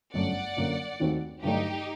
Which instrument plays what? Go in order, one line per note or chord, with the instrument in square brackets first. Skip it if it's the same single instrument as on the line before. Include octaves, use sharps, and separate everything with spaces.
[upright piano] G1 F#2 F#3 A3 [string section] D5 F#5
[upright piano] F#2 D3 F#3 A#3
D#2 D#3 A3 C4 F#4
[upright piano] G2 D3 F#3 A3 D4 [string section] D#4 G4